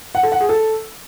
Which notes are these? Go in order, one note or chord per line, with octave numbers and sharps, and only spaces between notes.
F#5
A4
F#5
G#4
A4